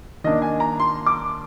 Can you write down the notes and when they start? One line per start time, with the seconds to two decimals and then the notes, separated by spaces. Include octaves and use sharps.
0.24 D#3 A#3 D4 D#5
0.42 G#5
0.60 A#5
0.80 C6
1.06 D6